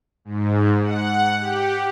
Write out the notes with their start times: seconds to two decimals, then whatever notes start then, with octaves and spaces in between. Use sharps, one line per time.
0.25 G#2
0.82 F#5
1.39 G4